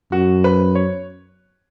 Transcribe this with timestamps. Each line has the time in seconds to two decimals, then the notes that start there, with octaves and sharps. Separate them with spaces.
0.12 F#2 F#4
0.44 B4
0.75 C#5